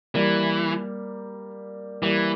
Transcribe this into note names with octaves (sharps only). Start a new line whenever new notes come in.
E3 G3 A#3
E3 G3 A#3